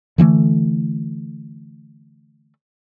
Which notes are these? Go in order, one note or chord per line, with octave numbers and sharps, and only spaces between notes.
D3 E3 G3 A3